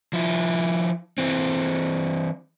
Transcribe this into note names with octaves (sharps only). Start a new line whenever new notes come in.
F3 E4
E3 C4